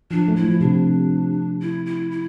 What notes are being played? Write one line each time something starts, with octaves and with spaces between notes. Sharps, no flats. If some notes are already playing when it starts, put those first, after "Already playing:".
F3 D4
A3
E4
F3
C3 D4
E4
E4
E4